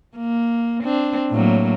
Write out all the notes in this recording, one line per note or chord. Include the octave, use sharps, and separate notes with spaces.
A#3
C4 D4
A2 F#3 A#3